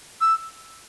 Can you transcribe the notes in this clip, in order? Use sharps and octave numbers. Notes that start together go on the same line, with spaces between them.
E6